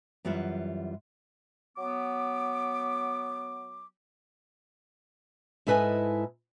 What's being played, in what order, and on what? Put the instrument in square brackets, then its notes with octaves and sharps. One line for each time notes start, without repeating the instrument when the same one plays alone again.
[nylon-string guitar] F#2 E3 G3 F4 E5 F#5
[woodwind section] F#3 B3 D6
[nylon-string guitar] G#2 E4 A4 B4 D#5 G#5